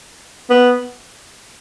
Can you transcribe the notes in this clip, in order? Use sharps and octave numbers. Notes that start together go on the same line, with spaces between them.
B3